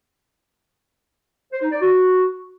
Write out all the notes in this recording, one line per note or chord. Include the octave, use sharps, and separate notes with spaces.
C5
D#4
D5
F#4